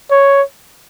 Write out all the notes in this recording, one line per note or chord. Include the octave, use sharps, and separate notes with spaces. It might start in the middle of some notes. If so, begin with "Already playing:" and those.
C#5